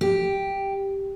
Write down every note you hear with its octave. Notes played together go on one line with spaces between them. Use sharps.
G4